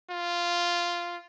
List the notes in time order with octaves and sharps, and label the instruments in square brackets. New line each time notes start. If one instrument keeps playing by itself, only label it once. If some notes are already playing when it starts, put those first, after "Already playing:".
[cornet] F4